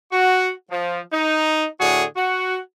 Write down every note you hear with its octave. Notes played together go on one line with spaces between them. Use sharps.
F#4
F3
D#4
A2 D3 F#4 G#4
F#4